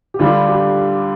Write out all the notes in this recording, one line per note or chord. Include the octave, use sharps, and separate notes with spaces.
G4
D2 D3 G3 D4 F4
G4